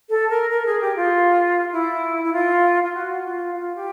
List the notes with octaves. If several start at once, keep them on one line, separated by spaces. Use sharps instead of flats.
A4
A#4
A#4
G#4
G4
F4
E4
E4
F4
F4
F#4
F4
F4
G4